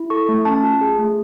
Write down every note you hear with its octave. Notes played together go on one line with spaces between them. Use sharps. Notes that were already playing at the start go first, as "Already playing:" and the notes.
Already playing: E4
A4 C#6
A3
C#4 A5
F4
G#4
A3